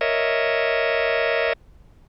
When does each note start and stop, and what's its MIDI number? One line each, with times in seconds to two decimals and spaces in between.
0.01 1.53 70
0.01 1.53 73
0.01 1.53 75
0.01 1.53 76